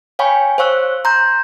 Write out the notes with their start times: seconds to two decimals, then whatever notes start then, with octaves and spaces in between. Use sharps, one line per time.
0.19 C#5 F5 G5 G#5 B5 C#6
0.58 C5 C#5 F5 C#6 E6 F#6
1.05 A#5 C6 G6